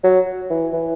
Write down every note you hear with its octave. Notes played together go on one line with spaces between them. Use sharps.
F#3
E3
E3